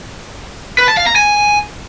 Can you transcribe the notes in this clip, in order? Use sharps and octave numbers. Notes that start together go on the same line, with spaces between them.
B4
A5
F5
A#5
G#5